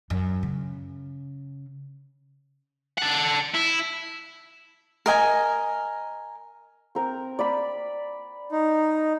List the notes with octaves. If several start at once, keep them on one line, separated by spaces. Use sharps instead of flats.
F#2
C#3
A4 F#5
E4
A#4 D#5 G#5
C4 A#4
D5 B5
D#4